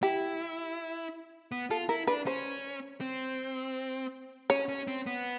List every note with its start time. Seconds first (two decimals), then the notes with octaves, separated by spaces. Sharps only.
0.03 E4 G4
1.52 B3
1.70 F4 A4
1.89 E4 A#4
2.07 D4 B4
2.26 C#4 C5
3.01 C4
4.50 C#4 C#5
4.69 C#4
4.87 C4
5.06 B3